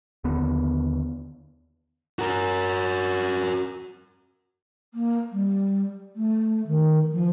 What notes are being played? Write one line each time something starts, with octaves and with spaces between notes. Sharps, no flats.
D#2 D3 B3
F#4 A#4
A#3
G3
A3
D#3
F3